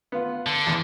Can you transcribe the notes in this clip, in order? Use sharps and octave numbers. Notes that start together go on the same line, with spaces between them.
B3 F4
D3
E2